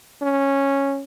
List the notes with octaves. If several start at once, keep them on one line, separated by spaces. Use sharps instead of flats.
C#4